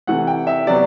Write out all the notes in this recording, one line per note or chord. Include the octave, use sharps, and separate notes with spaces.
C3 E3 A3 F#5
G5
E5
C3 F#3 B3 D5